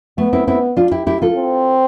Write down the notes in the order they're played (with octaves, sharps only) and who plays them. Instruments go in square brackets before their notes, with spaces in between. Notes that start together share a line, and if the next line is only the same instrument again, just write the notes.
[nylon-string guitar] A3 [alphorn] B3
[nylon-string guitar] C4 E4
[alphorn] B3 [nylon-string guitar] C4 E4
[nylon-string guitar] D4 F4
E4 G4
E4 G4
F4 A4
[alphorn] C4